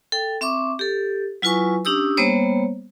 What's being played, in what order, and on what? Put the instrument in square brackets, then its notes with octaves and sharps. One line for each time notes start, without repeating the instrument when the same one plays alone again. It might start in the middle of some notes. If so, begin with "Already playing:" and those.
[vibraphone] A4 G5
C4 E5 C#6 D6
G4 A4
F#3 E4 F4 B4 G#5 C#6
C#4 D4 G4 D#6 E6
G3 A#3 B3 C5 C#5